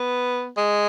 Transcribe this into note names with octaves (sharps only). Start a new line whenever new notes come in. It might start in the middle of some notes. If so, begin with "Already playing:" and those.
Already playing: B3
G#3